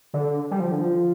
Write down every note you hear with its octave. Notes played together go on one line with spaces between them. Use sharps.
D3
G3
F3
D3
F3